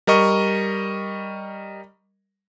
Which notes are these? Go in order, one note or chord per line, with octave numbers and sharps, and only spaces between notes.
G3 A#4 D#5 C#6